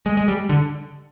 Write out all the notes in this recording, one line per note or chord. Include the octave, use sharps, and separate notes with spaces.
G#3
G#3
G3
D3